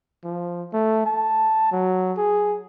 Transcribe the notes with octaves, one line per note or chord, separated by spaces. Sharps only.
F3
A3
A5
F#3
G#4